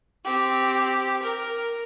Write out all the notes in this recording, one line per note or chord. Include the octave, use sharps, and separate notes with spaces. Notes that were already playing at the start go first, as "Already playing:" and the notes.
C4 G4
A#4